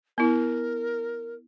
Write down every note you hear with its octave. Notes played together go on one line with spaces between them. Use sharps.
B3 E4 A#4